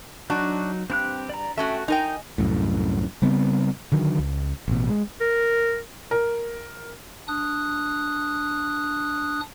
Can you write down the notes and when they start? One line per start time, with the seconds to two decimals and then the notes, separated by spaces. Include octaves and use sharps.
0.30 F#3 D4 D#4 F#4
0.90 G2 C4 G4 F#6
1.29 D5 A#5
1.58 A3 C#4 F#4 E5 G5
1.88 D#4 A#4 D#5 G5 G#5
2.38 C2 F#2 A2
3.22 C#3 G3 B3 C4
3.92 D3 D#3 F#3
4.19 C#2
4.68 A1 B2
4.89 G#3
5.21 A#4
6.11 A#4
7.28 D4 D#6 F#6